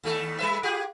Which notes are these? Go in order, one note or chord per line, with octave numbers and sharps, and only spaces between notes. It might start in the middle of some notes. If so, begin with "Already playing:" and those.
D#2 A3 A4
G3 B4 E5
F4 G4 G#4